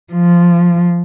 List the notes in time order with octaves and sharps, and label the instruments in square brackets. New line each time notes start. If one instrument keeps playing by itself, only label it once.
[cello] F3